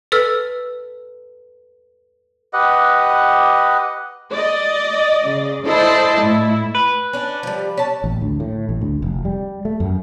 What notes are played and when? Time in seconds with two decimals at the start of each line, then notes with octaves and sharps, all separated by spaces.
0.12 A4 B4 E6 F6
2.53 G4 B4 D#5 F#5
4.31 D5 D#5
5.25 C#3
5.66 E4 A4 C5 D5 D#5 A5
6.21 A2 E4
6.75 B4
7.13 C#4 D4
7.43 F3 G3
7.77 C#4 A5
8.04 A1
8.21 D2
8.40 A2
8.69 A1
8.81 D2
9.02 F1
9.25 G3
9.65 A3
9.80 F#2